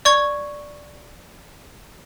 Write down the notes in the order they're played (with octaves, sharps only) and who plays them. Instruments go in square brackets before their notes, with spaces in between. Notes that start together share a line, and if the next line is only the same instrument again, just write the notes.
[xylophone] D5 C#6 G#6